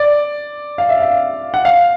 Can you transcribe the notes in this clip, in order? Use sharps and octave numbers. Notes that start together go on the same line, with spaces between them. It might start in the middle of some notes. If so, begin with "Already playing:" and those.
Already playing: D5
F5
E5
F5
F#5
F5